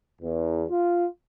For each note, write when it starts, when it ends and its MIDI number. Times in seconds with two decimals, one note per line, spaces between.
0.22 0.64 40
0.70 1.05 65